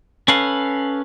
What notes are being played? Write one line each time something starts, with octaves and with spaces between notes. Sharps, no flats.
C#4 A4 B4 F5